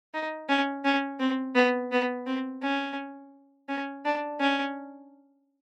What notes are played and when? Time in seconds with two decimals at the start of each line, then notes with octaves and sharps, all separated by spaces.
0.14 D#4
0.49 C#4
0.85 C#4
1.20 C4
1.55 B3
1.92 B3
2.27 C4
2.63 C#4
3.69 C#4
4.05 D4
4.40 C#4